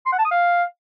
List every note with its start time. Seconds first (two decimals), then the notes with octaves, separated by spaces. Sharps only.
0.06 C6
0.12 F#5
0.19 A5
0.25 D#6
0.31 F5